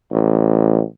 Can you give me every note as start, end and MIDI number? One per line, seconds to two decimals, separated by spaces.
0.11 0.82 33